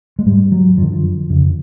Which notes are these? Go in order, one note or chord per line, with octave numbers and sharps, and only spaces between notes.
G#3
G#2 G3
F#3
F#2 D3 F3
F2 C#3